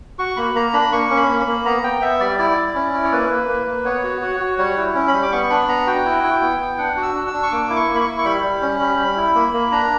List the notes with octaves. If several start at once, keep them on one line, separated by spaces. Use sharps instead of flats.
F#4 C#6
A#3 B5
A#3 A#5
D4 B5
A#3 C#6
C#4
B5
A#3
B5
A#3
B3 A#5
B3 G5
B3 E5
G3 D5
E4 D5
E4
C#4
E4
C#5
A#3 B4
A#3
A#3
A#3
B3 C#5
F#4
F#4
F#4
G3 C#5
E4
C#4
B5
G3
D6
B3 C#6
D4 B5
B3 A#5
F#4 G5
E4
E4
B3
B3
D4 F#5
F#4
E6
D4
E6
D4
C#6
A#3 D6
E4
C#6
A#3
B5
C#6
E4
C#6
G3 B5
G3
C#4
G3
G3
E4
A#3
A#3
D4 A#5